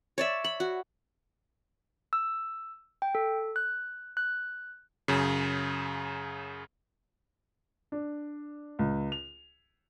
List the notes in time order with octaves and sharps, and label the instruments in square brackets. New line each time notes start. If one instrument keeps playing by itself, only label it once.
[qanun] C#5 D5 E5
B5
F#4
[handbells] E6
G5
A4
F#6
F#6
[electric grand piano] F#2 C#3
[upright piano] D4
C#2
F7